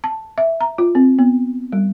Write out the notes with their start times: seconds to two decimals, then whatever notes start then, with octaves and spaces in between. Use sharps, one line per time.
0.04 A5
0.38 E5
0.61 A#5
0.78 F4
0.95 C4
1.19 B3
1.72 G3